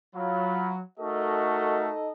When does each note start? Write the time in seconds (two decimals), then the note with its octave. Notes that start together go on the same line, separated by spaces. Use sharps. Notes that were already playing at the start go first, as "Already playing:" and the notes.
0.15 F#3 F4 F5 B5
0.99 A3 D#4 F#4 A4 A#4 D#5